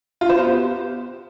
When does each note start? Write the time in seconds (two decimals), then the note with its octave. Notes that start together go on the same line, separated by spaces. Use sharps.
0.21 F4
0.29 C5
0.38 B3
0.46 G4